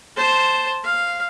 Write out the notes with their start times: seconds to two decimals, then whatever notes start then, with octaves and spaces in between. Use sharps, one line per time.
0.16 C5 A5
0.84 F5